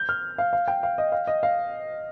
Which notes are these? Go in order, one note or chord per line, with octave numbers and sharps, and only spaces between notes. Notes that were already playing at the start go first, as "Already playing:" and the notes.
Already playing: G6
F6
F5
F5
G5
F5
D#5
F5
D#5
F5